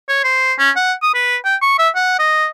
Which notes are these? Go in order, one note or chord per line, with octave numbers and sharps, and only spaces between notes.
C#5
C5
C#4
F#5
D#6
B4
G5
C#6
E5
F#5
D#5